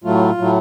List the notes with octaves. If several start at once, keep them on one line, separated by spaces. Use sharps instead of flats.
A2 F#3 A3 F4
A2 F#3 A3